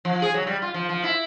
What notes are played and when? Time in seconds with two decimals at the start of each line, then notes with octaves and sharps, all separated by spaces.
0.05 F3
0.22 G#4
0.34 F#3
0.47 G3
0.62 F4
0.74 F3
0.89 F3
1.04 E4